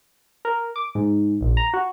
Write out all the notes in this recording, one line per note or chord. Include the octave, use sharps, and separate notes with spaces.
A#4
D6
G#2
A#1
A#5
F#4